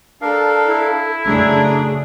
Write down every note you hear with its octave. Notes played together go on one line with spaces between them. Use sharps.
D4 A4 A#4 F5
E4
F#2 C#3 A3 D4 G#4 A#5